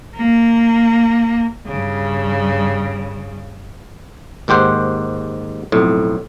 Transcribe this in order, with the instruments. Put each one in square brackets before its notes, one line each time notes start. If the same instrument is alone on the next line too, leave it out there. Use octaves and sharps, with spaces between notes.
[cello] A#3
G2 C#3
[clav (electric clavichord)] D#2 G#2 G4 C5 F#5
B1 F2 A2